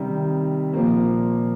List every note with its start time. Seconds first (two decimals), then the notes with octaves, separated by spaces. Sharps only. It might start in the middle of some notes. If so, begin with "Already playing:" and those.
Already playing: C3 D#3 G3
0.73 A#2 F3 A#3